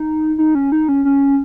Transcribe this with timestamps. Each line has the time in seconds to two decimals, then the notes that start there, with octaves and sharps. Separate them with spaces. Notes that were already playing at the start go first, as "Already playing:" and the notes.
Already playing: D#4
0.38 D#4
0.55 C#4
0.72 D#4
0.88 C#4
1.05 C#4